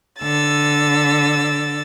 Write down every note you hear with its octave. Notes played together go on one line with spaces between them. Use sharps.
D3 E6 A6